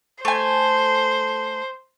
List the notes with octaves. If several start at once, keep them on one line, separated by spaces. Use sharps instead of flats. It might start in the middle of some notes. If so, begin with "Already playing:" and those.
A3 C5 G#5